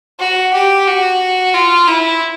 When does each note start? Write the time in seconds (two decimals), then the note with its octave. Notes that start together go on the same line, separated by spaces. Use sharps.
0.19 F#4
0.53 G4
0.87 F#4
1.54 F4
1.87 E4